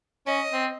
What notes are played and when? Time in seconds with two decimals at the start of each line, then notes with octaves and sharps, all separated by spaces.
0.26 C#4 D#5
0.53 C4